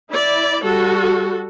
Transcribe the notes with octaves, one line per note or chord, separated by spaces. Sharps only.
E4 D5
G3 F#4 A4